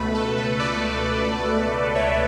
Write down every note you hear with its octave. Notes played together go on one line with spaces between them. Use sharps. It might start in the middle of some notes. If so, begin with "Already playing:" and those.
Already playing: C#2 B2 A3 B4
A4
B4
B4 D5
C#5 E5